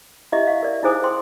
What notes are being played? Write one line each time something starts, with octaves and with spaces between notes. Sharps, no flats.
E4 G4 D#5 E5
F5
A#4 D5
D#4 E4 G#4 C5 G#5 D#6
C5 G5 C6